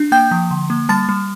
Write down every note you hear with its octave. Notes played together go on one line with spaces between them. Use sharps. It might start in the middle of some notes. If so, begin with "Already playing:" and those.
Already playing: D4
A#3 G5 G6
F3
D3
A#3
G3 A5 A6
G3